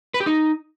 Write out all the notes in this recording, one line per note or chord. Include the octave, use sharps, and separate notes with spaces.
B4
G4
D#4